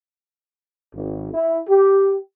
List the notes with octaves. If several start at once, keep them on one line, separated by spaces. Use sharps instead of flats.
G#1
E4
G4